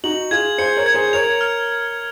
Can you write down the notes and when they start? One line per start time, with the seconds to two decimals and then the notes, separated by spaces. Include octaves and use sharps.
0.04 D#4 F#4 F#7
0.31 F4 G#4 G#6
0.58 G#4 C5 C#7
0.77 A#4 C#5
0.86 G#6
0.94 G#4 C5
1.13 A#4 C#5 F7
1.41 F6